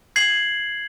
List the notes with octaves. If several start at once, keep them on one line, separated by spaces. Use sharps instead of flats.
G#6 C7 F#7